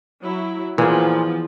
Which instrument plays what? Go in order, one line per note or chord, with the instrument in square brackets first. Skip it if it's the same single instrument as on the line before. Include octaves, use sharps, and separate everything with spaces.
[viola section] F#3 E4
[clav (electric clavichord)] A#2 [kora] E3 G#4 [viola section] F3 B3